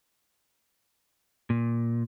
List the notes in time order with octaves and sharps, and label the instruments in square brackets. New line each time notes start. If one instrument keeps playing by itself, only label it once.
[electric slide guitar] A#2